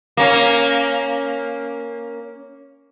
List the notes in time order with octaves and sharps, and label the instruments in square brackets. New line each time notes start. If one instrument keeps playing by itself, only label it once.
[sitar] A#3 C#4